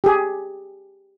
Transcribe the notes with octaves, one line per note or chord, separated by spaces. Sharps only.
G4 G#4